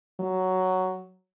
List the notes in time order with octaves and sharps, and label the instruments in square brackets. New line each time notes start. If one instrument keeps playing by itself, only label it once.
[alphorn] F#3